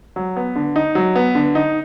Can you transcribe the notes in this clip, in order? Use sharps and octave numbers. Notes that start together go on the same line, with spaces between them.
F#3
B3
D3
D#4
F#3
B3
D3
D#4